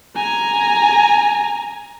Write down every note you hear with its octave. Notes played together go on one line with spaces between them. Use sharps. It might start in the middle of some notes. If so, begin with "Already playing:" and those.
G#5 A#5